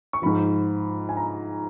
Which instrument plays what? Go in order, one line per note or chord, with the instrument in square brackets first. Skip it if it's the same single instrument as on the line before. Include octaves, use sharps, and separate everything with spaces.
[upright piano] C#6
G#2 F3 B5
G#5
A#5